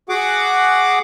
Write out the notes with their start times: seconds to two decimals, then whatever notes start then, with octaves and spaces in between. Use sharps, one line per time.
0.09 F#4 G#4 F#5 D6